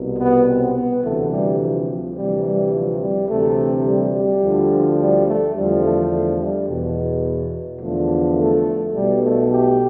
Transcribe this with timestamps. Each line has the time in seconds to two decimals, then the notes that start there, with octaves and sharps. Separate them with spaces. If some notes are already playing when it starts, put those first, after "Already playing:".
Already playing: C2 B2
0.19 B3
0.47 C4
0.76 B3
1.04 D2 C3 E3 A3
1.31 G3
1.60 F3
1.89 F3
2.16 D2 C3 E3 G3
2.45 G3
2.73 F3
3.01 G3
3.29 D2 C3 E3 A3
3.85 G3
4.13 G3
4.43 D2 D3 F3
4.99 G3
5.28 A3
5.55 E2 D3 F3 G3
5.84 A3
6.12 A3
6.40 G3
6.68 E2 B2
7.81 E2 D3 F3 A3
8.38 A3
8.94 B1 B2 G3
9.22 A3
9.50 G4